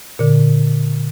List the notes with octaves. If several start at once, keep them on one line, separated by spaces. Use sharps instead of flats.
A#2 D3